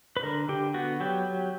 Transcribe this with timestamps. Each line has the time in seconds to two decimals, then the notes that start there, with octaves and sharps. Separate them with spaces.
0.17 B4
0.23 D3 A#4
0.49 D3 G4
0.74 B3 F#4
1.00 F#3 G4